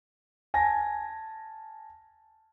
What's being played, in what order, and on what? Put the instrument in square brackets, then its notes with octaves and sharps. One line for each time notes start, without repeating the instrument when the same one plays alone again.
[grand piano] G#5 A5 A#6